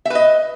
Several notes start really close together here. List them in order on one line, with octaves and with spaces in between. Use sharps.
E5 B4 D#5